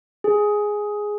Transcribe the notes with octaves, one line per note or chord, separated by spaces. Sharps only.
G#4